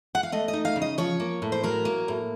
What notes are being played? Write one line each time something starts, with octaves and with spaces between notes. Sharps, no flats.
F#5
F5
A3 D#5
D#5
D#4
F5
C#3
D#5
F3 C#5
A#3
A2
C5
F#3 A#4
A#3
A2